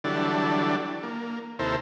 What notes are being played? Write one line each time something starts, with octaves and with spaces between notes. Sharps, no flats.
D3 E3 F#3 G3 D4 A4
A#3
D#2 C3 E4 A4 A#4 C5